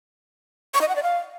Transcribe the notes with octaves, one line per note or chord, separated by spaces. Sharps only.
C#6
D#5
F#5
D5
F5